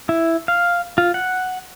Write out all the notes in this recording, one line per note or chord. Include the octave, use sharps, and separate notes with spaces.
E4
F5
F4
F#5